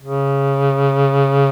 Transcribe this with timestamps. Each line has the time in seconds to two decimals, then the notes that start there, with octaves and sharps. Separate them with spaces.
0.02 C#3